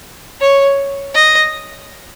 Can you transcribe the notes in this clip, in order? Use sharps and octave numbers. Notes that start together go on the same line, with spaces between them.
C#5
D#5